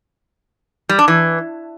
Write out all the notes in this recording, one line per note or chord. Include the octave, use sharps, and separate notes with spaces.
G3
D4
E3